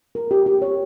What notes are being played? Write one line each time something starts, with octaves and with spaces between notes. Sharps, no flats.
A#4
G4
G4
C#5